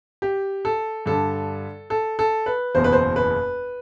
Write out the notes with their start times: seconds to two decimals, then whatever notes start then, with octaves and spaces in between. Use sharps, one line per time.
0.22 G4
0.65 A4
1.06 G2 D3 G3 A4
1.90 A4
2.19 A4
2.46 B4
2.75 F#1 E2 B2 C5
2.84 B4
2.92 C5
3.16 B4